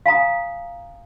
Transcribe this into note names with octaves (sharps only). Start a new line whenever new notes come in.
F5 G#5 A#5 D#6